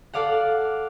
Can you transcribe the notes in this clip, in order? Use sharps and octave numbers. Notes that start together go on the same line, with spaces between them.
A4 D5 F5 F#5